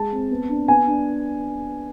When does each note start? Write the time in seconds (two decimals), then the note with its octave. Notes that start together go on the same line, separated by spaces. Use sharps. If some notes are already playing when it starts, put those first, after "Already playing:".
Already playing: G#3 A5
0.12 C4
0.31 B3
0.49 D4
0.68 B3 G#5
0.87 D4